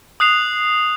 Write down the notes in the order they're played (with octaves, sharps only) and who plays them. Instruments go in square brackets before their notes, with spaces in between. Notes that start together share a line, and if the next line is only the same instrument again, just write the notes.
[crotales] D#6 F#6 C7 F7